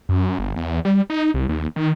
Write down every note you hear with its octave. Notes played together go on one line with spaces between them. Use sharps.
F#2
G1
E2
G3
D#4
C2
D#2
D#3